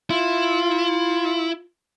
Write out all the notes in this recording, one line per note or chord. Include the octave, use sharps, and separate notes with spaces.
E4 F4